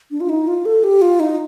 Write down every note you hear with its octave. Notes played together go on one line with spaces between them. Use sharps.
D4
F4
D#4
F4
A4
G4
F4
D#4